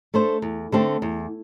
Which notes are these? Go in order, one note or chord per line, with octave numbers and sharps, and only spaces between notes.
A3 D4 A4 C5
E2
D3 A3 C4 A4
E2